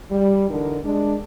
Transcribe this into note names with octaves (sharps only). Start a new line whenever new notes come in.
G3
D3 E3 D4 D#4 A#4
G#3 D4